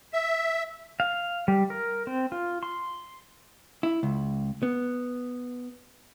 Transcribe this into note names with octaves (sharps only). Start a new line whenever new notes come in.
E5
F5
G3
A#4
C4
F4
C6
E4
C#2
B3